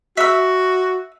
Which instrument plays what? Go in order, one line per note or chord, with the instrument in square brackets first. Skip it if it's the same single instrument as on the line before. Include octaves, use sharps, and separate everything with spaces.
[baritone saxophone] F#4 [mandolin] E5 E6